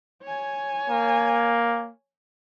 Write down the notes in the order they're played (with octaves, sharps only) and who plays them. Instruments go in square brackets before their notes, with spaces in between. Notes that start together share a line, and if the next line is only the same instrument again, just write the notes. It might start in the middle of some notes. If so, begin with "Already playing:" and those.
[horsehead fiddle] C#5 G#5
[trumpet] A#3